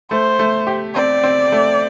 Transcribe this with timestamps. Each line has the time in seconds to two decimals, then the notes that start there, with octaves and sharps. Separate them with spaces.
0.11 A3 C5
0.39 A3
0.67 G4
0.95 C4 D5
1.24 C4
1.52 A3